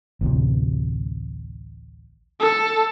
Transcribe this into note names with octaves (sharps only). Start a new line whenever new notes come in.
A1 D2 C3
A4